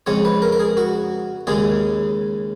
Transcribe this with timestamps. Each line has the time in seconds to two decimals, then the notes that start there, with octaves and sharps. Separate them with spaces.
0.06 F2 C#3 G#3 C#5
0.25 B4
0.42 A#4
0.52 A#4
0.59 G#4
0.77 F#4
1.47 D#2 C#3 G#3 G#4